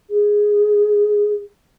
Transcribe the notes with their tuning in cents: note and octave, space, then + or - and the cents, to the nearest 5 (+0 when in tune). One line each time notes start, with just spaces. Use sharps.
G#4 +0